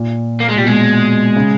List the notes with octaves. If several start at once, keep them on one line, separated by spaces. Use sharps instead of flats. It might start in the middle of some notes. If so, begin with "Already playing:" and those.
Already playing: A#2
A#3
G#3
A#2 G3
B2 G#3
C#3